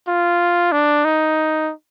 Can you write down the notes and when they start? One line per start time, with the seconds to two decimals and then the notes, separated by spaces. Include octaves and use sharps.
0.08 F4
0.72 D4
1.05 D#4